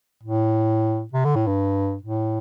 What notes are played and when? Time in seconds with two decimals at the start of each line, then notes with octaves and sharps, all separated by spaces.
0.23 A2
1.13 C3
1.25 D3
1.35 A2
1.47 G2
2.03 A2